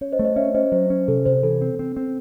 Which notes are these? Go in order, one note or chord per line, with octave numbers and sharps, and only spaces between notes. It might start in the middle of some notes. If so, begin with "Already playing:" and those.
C#4 C#5
C5 D#5
A3
C5 D#5
C#4 C#5 E5
C#4 C5 D#5
F#3 C5
C#4
C3 A4
C3 C5
E3 A4
C4
C4
C4